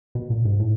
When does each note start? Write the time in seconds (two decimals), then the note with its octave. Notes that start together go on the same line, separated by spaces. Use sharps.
0.15 B2
0.30 A#2
0.45 G#2
0.60 A2